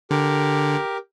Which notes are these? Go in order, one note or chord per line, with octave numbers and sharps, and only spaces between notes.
D3 G4 A#4